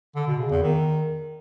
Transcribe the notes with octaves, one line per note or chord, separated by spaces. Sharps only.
D3
B2
C#3
E2
D#3